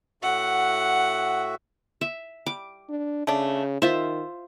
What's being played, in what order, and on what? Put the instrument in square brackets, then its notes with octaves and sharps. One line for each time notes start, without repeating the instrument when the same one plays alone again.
[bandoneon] A2 F#4 E5 [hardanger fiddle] F#5
[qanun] E5
[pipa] G3 [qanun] D6
[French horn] D4
[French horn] C#3 [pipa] A3 D4
[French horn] D#3 [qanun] F4 E5 [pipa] C5